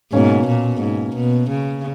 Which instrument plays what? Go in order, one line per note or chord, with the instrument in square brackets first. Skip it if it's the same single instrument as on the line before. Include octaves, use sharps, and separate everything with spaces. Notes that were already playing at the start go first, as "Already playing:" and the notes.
[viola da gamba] G#2 [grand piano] B2 A#3 C#4
[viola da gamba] A#2
G#2
B2
C#3